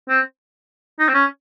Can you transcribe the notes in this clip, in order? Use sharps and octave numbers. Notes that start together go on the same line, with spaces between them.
C4
D#4
C4
C#4